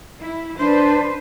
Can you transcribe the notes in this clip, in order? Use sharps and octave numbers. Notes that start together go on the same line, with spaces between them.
E4
D4 B4 C5